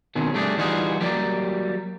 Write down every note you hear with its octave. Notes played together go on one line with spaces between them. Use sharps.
B2 D#3 C4 C#4
G3 A3 D4 F4 G4 G#4
E3 G3 D#4 F4 F#4 G#4
F#3 G3 A#3 G4